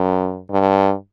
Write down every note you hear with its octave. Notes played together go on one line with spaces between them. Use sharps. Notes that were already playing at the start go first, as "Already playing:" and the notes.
Already playing: F#2
G2